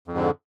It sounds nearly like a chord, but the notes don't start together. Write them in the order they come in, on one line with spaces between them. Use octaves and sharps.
F2 G#2 D3